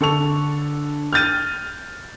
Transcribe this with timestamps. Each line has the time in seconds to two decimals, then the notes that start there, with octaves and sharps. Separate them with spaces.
0.01 D3 A4 C#6 F7
1.13 F6 G6 A6 D#7